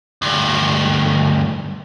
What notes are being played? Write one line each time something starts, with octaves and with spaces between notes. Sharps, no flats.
D2 G2